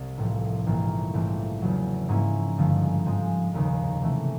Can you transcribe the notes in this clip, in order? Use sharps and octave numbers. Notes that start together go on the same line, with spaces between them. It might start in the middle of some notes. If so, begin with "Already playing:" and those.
Already playing: C2 G3
A1 A2 F3
A#1 G#2 E3 G3 A#3
A#1 G#2 E3 A3 C4
E2 C#3 F#3
G#2 F3 A#3 C#4 E4
G1 G2 D3 F3 G#3
G#2 F3 G#3 C4
F1 D#2 C#3
C3 E3 A3 C#4